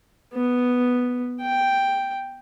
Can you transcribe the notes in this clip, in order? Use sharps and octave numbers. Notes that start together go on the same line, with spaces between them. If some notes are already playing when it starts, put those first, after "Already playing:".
B3
G5